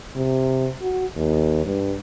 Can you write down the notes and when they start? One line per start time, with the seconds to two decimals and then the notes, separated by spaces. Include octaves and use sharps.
0.16 C3
0.82 F#4
1.16 D#2
1.65 G2